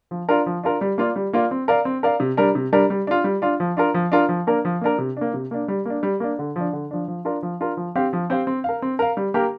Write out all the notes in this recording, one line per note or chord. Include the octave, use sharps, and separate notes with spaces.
F3
D4 F4 A#4 D5
F3
D4 F4 A#4 D5
G3
A#3 F4 D5
G3
A#3 F4 D5
C4
A#4 D5 F5
C4
A#4 D5 F5
C3
G3 D4 A#4
C3
G3 D4 A#4
G3
D4 F4
G3
D4 F4
F3
D4 F4 A#4
F3
D4 F4 A#4
F3
A#3 D4 A#4
F3
A#3 D4 A#4
C3
A#3 D4
C3
A#3 D4
G3
A#3 D4
G3
A#3 D4
D3
F3 D4
D3
F3 D4
F3
D4 F4 A#4
F3
D4 F4 A#4
F3
C4 G4 C5 F5
F3
C4 G4 C5 F5
C4
A#4 F5
C4
A#4 F5
G3
A#3 G4 A#4